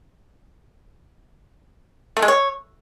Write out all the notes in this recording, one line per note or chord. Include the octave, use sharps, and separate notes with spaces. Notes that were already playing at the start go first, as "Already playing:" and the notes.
A3
G#3
C#5